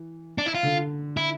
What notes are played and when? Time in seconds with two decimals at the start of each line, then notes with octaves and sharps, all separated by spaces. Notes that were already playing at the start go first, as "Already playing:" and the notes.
Already playing: E3
0.38 D4
0.46 E4
0.54 F4
0.63 D3
1.17 E4